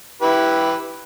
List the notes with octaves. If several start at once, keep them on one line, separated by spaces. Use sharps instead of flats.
E4 G4 B4